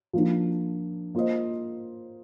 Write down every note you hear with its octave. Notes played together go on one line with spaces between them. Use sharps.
F3 A#3 D4
A#3 F4 C5 D#5